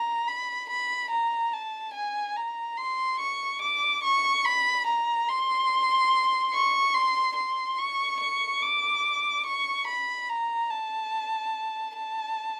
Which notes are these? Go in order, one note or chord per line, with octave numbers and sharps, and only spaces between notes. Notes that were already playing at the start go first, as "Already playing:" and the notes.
Already playing: A#5
B5
B5
A#5
A5
G#5
A#5
C6
C#6
D6
C#6
B5
A#5
C6
C#6
C6
C6
C#6
C#6
D6
C#6
B5
A#5
A5
A5